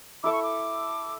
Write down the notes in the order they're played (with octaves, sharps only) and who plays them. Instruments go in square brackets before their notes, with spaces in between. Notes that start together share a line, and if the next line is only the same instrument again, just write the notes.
[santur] E4 A4 E5 [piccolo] D6
[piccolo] C#6
D6